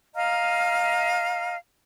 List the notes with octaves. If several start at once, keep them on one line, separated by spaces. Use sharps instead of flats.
D#5 F5 A#5 F6